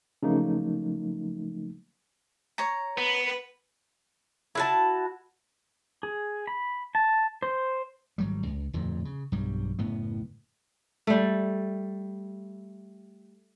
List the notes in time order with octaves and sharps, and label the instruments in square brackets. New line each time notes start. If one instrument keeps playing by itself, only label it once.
[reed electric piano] C#3 F3 F#3 A3 A#3 D#4
[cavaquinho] C#5 A#5
[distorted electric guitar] B3 [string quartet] B4
[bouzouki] E4 F#4 A5
[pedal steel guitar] G#4
B5
A5
C5
[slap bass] G#1 F#3 G3
C#2
D1 F2 A#2
C#3
B1 G2 F#3 G3
F#1 A2 B3
[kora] G3 A3